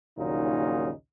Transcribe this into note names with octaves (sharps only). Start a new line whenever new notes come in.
A#1 D#2 A#2 C#3 F#3 D#4